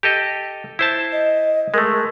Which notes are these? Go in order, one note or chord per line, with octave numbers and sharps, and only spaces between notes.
G4 A4 D#5
E4 C5 A5
D#5
G#3 A3 A#4